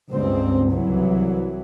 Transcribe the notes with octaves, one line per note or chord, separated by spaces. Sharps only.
C#2 G2 C4
C2 E3 F#3